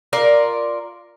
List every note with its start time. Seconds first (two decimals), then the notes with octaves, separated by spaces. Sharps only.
0.13 F4 A#4 D5